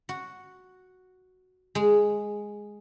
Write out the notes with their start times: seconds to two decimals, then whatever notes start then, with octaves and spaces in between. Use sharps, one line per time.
0.09 F#4
1.75 G#3